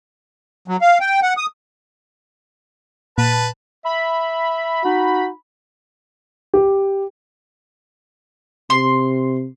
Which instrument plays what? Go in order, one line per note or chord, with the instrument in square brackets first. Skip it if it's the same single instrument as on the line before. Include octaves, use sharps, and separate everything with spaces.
[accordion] F#3
F5
G5
F#5
D#6
[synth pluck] A#2 [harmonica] B4 A5
[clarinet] E5 [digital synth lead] B5
[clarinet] D#4 [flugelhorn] F#4
[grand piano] G4
[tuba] C3 [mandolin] C6